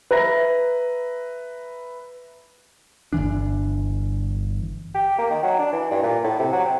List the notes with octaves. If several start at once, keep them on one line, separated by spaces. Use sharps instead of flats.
B4 E5 A#5 A#6
G1 F2 E3 D4
G4
A#3
D#3
F#3
D4
E3
G2
A#2
A2
C3
F#3
C4